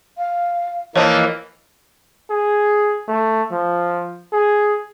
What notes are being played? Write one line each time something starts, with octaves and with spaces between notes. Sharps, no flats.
F5
E3 F3 A#3 C#5 D#5
G#4
A3
F3
G#4